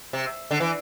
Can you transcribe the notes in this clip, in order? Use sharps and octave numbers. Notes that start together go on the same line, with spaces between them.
C3
D3
E3